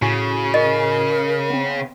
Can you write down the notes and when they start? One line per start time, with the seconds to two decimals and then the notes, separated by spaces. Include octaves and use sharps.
0.02 A2 C#3 F#4 G#5
0.54 A#4 D#5
1.50 B3 C4